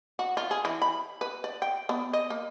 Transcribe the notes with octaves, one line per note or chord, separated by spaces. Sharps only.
F#4
F4
G#4
E3
B5
B4
D5
G5
B3
D#5
A#3